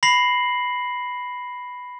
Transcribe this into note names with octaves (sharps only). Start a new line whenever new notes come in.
B5 A#6 C7 F#7